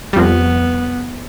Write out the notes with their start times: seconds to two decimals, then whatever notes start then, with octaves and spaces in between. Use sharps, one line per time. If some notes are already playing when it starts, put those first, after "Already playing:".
0.13 G3
0.16 F2 F3 B3